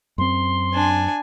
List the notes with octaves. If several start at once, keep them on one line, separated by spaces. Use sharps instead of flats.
F#2 C4 C6
D4 G#5